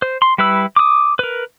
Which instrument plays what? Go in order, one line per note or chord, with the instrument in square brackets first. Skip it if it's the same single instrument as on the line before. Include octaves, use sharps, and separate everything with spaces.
[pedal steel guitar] C5
C6
G3 E4 B4 B5 E6
D6 D#6
A#4 B4